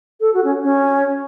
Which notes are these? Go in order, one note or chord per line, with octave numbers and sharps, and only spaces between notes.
A4
F#4
C#4
C#4